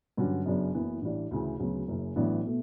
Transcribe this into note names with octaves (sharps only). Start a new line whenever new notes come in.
G2 D3 F#3 C#4 F#4
F#2 C#3 F#3 B3 D4
F#1 F#2 E3 B3
A1 A2 G3 D4
D2 C#3 E3
D2 C#3 F#3 B3
F#1 F#2 C#3
A1 A2 F#3 B3 D4
B2 A3